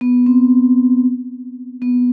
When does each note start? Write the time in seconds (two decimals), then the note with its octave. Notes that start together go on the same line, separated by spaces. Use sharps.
0.01 B3
0.26 C4
1.82 B3